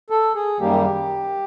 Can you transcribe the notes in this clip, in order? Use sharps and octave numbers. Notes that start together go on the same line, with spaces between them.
A4
G#4
F#2 D#3 G3 A#3 G4